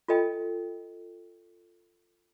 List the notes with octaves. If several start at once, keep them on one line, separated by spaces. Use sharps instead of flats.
F4 A4 D#5 G5